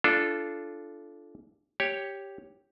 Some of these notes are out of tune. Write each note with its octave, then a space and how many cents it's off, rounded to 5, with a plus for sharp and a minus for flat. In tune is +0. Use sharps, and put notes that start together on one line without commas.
D4 +0 F4 -25 A4 -15
G4 +0 C#5 +0